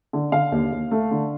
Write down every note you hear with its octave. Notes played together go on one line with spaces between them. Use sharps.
D3
D3 F5
D#2
D#2
A3
D3